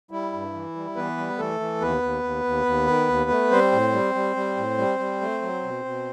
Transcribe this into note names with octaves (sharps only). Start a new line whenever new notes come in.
G3 E4
G2
E3
G3
E3 B3 B4
G3
E3 A3 A4
E3
D#2 B3 B4
D#2
D#2
D#2
D#2
D#3
D#2
A3
G3 C4 C5
A2
G3
G3
G3
A2
G3
G3
A3
F#3
B2
B2